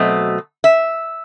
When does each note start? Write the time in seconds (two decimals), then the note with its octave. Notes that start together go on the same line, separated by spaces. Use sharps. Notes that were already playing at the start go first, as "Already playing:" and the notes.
Already playing: B2 F#3 A3 C4 D#5
0.64 E5